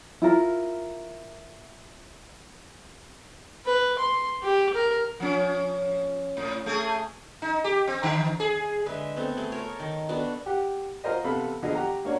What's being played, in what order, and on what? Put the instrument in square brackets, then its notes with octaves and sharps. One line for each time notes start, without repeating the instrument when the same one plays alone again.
[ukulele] E4 F4 A#4
[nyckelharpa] B4
C6
G4
A#4
[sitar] F3 C#4
A2
A3 G#4
D#4
G4
C4
D3
G#4
[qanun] D3 G#3 B4 E5
A3 B3 C4 A4
A3 G#4
A4 A#4 C#5
D#3
B3 D4 F#4 A4
[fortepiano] G4 F#5
F4 F#4 A#4 C5 D#5
C3 B3 A4 F5 B5
A#2 D3 F3 B3 G#4 D#5
F#4 G4 F#5 A#5
A#3 C#4 D4 F#4